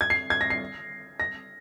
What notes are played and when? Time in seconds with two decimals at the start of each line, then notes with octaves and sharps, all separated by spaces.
0.01 G#6
0.10 C7
0.30 G#6
0.41 A#6
0.50 C7
1.20 A#6